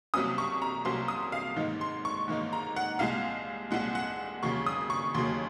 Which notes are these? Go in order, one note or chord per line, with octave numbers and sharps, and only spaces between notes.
C2 C3 F#3 A#3 C#4 D#6
C#6
A#5
C2 C3 F#3 A#3 C#4 C6
D#6
F5
G#2 D#3 A#3 D#4
C6
C#6
G#2 D#3 A#3 D#4
A#5
F#5
C2 A#2 G#3 F5
C2 A#2 G#3 F#5
F#5
D#2 C#3 F#3 A#3 C#6
D#6
C#6
D#2 C#3 F#3 A#3 C6